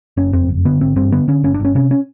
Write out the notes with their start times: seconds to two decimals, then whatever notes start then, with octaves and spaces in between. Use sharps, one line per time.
0.17 F#1 C#4
0.33 F2 C4
0.49 F#1
0.65 D3 B3
0.80 G#1 C4
0.96 G2 C4
1.12 D3 B3
1.28 D3 C#4
1.43 G1 C#4
1.54 D4
1.60 G1
1.65 C#4
1.75 C3 C#4
1.91 C#4